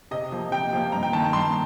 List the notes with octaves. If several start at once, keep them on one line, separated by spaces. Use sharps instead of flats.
C3 D#5
F3 A#3
C3 G5
F3 A#3
G2 A#5
G5
D#3 A#3 A5
A#5
G2 C6